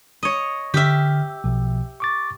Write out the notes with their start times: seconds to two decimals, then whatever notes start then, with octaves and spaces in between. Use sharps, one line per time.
0.23 C#5 D#5
0.74 D3 G4 E5 F6
1.44 B1 B2 F3
2.00 C#6 D6 A6